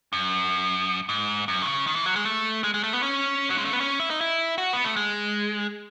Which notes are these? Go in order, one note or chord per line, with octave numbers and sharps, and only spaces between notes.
F#2
G#2
F#2
D#3
C#3
D#3
E3
F#3
G#3
A3
G#3
G#3
A3
B3
C#4
F#3
G#3
A3
B3
C#4
E4
D#4
E4
F#4
B3
A3
G#3